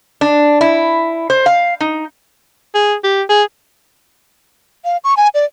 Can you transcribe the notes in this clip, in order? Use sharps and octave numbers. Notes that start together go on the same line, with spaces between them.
D4
E4
C5
F5
D#4
G#4
G4
G#4
F5
C#6
G#5
D5